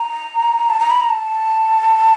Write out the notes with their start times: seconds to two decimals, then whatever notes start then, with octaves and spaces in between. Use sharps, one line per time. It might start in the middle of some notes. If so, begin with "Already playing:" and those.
Already playing: A#5
0.70 A5
0.80 A#5
0.90 B5
1.00 A#5
1.10 A5